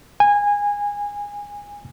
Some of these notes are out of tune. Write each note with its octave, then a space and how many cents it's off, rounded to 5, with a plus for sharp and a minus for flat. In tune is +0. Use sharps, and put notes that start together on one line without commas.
G#5 -20